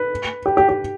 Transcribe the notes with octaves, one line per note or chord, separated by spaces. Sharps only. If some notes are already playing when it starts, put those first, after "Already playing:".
Already playing: B4
G4
G4
G4